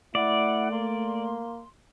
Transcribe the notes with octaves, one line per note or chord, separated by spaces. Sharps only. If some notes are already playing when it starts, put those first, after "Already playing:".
A3 E4 D5 F#5
A#3 C6